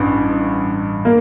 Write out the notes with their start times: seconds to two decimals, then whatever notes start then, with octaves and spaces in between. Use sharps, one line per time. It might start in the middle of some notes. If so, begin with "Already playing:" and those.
Already playing: A1 G2
1.05 A#3